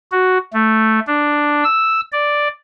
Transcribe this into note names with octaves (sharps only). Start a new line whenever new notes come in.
F#4
A3
D4
E6
D5